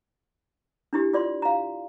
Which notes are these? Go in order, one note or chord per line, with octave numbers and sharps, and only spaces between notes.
D4 E4 G4
F4 D5 C6
F5 A#5